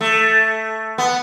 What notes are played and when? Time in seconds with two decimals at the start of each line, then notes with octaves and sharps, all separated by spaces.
0.01 A3
0.98 B3